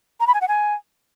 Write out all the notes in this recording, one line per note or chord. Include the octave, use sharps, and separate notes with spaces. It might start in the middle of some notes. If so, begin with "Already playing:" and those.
A#5
B5
G#5
F#5
G#5